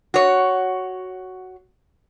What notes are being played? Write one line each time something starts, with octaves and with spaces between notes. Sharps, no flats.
F#4 C#5